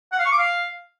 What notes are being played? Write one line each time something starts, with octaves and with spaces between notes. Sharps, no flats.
F#5
F5
C#6
D6
F5